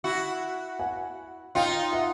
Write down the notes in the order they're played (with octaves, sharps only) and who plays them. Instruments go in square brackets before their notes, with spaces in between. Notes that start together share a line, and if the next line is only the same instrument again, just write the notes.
[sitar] E4 F#4
[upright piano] F#5 G#5
[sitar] D#4 F4 [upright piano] F5 G5
[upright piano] E5 F#5